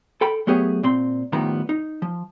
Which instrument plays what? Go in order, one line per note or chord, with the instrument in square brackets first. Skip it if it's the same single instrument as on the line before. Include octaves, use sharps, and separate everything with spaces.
[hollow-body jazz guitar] A4 G5 B5
F#3 A3 B3 G4 G#4 C#5
A#2 C4 C6
A2 D#3 F3 G3 B3 A#5
D#4
F3